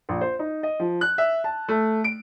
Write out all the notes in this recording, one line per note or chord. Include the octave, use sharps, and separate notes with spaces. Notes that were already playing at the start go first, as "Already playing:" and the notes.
A#1
C5
D#4
D#5
F3
F#6
E5
A5
A3
D7